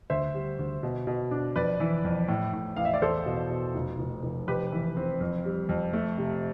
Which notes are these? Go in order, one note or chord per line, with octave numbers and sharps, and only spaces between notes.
D2 C5 E5
G3
D2
B2
B2
D4
F2 B4 D5
E3
F2
A2
A2
A1 F5
E5
D5
E2 A4 C5
B2
B2
F1
F1
F1
F2 G4 B4
E3
C4
F2
G3
F2
A3
C3